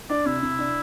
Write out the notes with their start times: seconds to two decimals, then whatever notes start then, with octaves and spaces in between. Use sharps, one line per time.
0.10 D4 D5
0.26 C3 E4
0.42 C3
0.59 D4